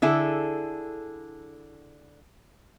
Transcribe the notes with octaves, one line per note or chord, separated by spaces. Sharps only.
D3 E4 G#4 A4